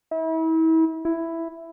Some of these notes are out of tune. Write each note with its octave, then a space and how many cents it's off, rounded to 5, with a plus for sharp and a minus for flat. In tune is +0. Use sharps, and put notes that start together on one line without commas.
E4 -35
E4 +5